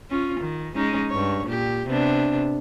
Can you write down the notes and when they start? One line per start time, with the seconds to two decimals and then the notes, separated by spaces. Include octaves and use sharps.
0.10 C#4 F4
0.40 D#3
0.76 G#3 C#4 D#4
1.10 G2 C#5
1.47 A#2 G4
1.87 C3 B3 D4